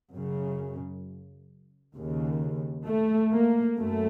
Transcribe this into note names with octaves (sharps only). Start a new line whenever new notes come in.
F#2 C#3
D#2 C#3
A3
A#3
F#2 A3